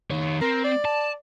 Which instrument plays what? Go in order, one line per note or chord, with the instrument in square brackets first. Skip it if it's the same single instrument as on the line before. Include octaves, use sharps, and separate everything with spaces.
[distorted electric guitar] D#3 C#5
[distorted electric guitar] C4 [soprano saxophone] A#4
[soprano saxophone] D5
[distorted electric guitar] A5